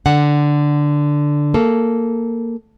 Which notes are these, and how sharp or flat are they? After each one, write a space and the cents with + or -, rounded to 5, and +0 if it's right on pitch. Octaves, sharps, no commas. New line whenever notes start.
D3 +0 F#5 +0
A#3 -10 A4 -15